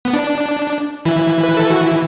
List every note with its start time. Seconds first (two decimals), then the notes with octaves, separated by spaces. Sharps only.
0.05 B3
0.13 D4
1.05 E3 E4
1.44 B4
1.57 A4
1.71 F#4
1.85 E4